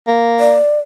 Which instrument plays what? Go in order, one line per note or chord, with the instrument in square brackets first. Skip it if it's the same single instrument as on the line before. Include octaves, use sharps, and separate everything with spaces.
[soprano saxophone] A#3
[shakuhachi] D5